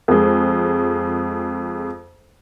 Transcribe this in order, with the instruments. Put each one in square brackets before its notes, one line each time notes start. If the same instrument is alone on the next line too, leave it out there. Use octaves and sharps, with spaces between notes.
[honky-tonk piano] F2 G#3